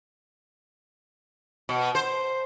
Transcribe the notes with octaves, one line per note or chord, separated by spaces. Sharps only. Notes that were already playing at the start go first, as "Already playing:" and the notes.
B2
C5